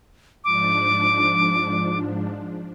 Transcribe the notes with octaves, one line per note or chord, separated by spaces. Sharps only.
G#2 F3 D4 D6